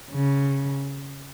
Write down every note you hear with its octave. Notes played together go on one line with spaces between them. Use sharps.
C#3